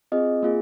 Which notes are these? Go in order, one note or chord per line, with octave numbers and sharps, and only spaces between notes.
C4 F4 G#4 D#5
A#3 F4 G#4